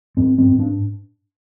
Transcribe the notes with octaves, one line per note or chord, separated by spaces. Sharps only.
G#2 C4
C4
G#2
D4